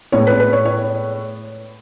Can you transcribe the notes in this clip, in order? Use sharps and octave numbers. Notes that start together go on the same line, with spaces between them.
A2 G#3 B3 C#5
B4
B4
C#5
C#5